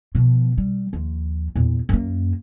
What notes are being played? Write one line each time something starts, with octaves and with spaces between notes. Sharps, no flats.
B2 F3
G3
D#2 F3
E2 A#2
F#2 A#3